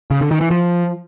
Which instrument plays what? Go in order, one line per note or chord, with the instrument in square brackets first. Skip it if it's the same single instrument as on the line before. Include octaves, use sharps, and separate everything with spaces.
[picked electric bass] C#3
D3
D#3
E3
F3